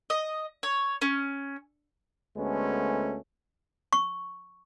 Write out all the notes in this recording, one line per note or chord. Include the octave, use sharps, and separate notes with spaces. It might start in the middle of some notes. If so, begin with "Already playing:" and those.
D#5
C#5
C#4
D2 G#3 A3 B3 C#4
C#6